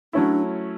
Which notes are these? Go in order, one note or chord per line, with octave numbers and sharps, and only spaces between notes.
F#3 A3 C#4 D4 E4